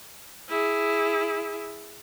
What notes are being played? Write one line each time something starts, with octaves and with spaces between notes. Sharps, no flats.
E4 G#4